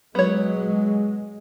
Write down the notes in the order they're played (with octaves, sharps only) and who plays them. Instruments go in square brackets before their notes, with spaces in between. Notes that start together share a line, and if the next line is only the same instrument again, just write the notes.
[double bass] F#3 [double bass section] G#3 [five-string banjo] B3 C#5